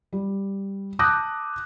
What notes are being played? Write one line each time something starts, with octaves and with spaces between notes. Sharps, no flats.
G3
A5 D6 D#6 F#6 G6 A#6